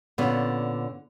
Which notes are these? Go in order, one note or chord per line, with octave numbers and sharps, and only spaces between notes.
A#2 D3 B3 C#4